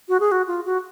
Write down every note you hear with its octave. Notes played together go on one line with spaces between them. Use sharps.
F#4
G#4
F#4
F4
F#4